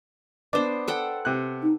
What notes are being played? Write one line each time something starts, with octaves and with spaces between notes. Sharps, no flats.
B3 D4 C5 D6
A4 F#5 G5
C3 F#6
D#4